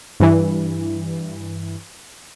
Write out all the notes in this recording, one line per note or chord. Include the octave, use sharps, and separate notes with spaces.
G2 E3